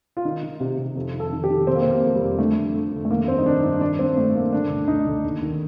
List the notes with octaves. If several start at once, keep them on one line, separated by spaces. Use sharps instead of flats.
F4
D#3 D#4
D#3
C3
C3
F2
D#3
A4
D#3
G4
D#3
C3 C4
A#3
C3 C4
A#3
F2
G3
F2
D3 A3
F2
F2
D3
A3
D#3 A#3
G2 C4
D#4
D#3 D4
G2 D#4
D#3 D4
G2 C4
G2 A3
G2 A#3
D3 D4
D2
D2 D#4
D2
D#2
D#3